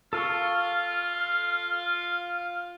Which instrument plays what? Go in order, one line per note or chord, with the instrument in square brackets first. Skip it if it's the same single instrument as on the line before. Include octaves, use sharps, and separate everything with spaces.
[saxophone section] F4 [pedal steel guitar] A4 F5 C#6 [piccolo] F6